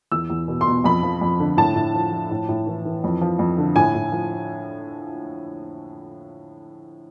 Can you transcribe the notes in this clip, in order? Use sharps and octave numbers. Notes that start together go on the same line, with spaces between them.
E2 E6
E2
B2
C6
B2
F2 B5
F3
F2
D3
A2 A5
A2
F3
F3
A2
A2
E3
E3
F2
F3
F2
D3
A2 G#5
A2
F3